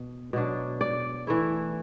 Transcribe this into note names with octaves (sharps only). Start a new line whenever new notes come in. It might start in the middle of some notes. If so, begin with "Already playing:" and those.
Already playing: B2
B2 F#3 D4
D5
E3 A3 E4